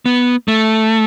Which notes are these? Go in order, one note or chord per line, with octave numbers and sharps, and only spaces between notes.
B3
A3